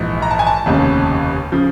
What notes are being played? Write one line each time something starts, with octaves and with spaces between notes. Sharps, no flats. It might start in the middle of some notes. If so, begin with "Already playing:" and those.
Already playing: A#1 G#2 E3
A#5
A5
G#5
A5
F1 D#2 C#3
C#3 F3